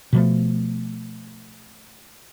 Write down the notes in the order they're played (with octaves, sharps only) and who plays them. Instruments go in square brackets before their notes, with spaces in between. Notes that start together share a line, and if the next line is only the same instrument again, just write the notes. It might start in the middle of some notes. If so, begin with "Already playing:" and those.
[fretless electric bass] B2 F3 A3